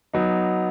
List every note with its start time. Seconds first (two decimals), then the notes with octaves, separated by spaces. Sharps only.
0.13 F#3 B3 D#4